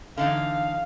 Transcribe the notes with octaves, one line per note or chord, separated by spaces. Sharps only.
D3 E3 D#4 F5